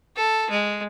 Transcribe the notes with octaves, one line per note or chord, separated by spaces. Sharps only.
A4
G#3